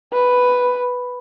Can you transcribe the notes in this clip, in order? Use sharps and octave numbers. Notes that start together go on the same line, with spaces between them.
B4